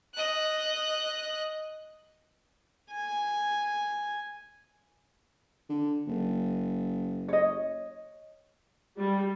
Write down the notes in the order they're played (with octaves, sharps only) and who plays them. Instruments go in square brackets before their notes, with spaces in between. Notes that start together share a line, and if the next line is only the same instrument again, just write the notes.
[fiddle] D#5 F#6
[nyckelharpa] G#5
[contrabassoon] D3
F#1
[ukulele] C#5 D#5
[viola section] G3